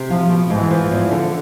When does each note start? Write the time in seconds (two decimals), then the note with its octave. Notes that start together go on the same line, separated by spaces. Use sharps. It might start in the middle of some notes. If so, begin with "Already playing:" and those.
Already playing: C3
0.10 F3 F4
0.29 B2
0.50 G#2 E3
0.70 F3
0.91 E2
1.11 D3